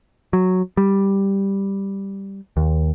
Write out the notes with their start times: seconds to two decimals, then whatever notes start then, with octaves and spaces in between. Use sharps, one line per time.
0.33 F#3
0.77 G3
2.57 D#2